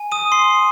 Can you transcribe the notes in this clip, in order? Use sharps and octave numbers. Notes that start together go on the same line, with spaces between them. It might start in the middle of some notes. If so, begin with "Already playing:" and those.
Already playing: G#5
D#6 D#7
C6 C7